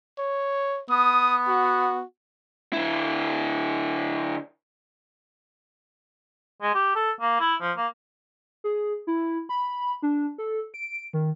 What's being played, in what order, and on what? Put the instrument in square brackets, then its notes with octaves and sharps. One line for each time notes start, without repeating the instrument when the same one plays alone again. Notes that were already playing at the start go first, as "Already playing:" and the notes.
[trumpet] C#5
[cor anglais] B3 [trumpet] D#6
[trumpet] F#4
[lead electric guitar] D3 E4
[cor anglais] G#3
G4
A4
A#3
E4
F3
A#3
[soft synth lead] G#4
E4
B5
D4
A4
D7
D#3